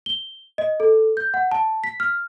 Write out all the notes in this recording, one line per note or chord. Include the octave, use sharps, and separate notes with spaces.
G7
D#5
A4
G6
F#5
A5
B6
F6